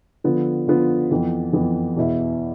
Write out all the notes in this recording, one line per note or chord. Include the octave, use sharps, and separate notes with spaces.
D3 F3 B3 F4
D3 F3 B3 F4
F2 E3 B3
F2 E3 B3
E2 B2 B3 E4